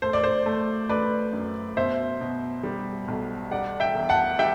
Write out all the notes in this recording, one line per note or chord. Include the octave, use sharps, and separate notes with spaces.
A3 C5
D5
C5
A3
A3 B4 D5
F#2
B2 C5 E5
B2
G3
B1
G3 D5 F#5
E5 G5
E1
F#5 A5
G3 E5 G5